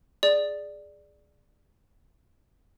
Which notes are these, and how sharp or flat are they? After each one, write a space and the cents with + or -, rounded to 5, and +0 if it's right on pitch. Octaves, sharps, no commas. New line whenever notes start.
G#4 +0 D5 +5